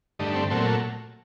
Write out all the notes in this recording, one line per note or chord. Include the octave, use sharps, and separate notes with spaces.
G2 D3 A3 D#4
C4
A#2 F#3 A3 C4